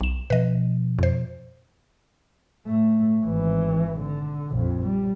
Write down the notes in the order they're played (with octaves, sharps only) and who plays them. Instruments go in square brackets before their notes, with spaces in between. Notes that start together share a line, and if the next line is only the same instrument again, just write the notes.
[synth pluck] B1 E7
[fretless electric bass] B2 F3 C#4 [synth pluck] B4 D#5
[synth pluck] F2 C5
[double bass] A2 A3
G#1 E3
D3
A#1 F2
G3